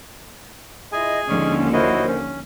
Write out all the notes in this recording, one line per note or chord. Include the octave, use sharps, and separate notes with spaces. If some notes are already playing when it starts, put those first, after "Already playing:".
E4 F4 G#4 D#5 G#5
D#2 D3 F3 G#3 C#4
F#2 E4 F#4 A#4 C5 D#5
C#4